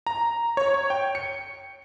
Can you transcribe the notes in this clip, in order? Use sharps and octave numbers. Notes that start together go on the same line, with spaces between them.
A#5
C#5
C#5
G5
C#7